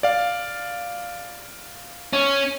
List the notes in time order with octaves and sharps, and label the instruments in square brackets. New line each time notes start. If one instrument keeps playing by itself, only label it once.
[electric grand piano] D5 F5
[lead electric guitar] C#4